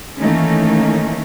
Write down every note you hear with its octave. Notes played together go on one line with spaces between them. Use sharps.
D#3 E3 A3 A#3 C#4 D#4